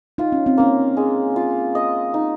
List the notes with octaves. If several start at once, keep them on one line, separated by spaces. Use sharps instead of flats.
D#4 F4
C#4
C4
A#3 C#4
G#3
F4
D#5
D#4